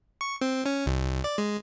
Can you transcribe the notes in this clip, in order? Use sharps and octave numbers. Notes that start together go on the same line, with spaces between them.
C#6
C4
C#4
C2
D5
G#3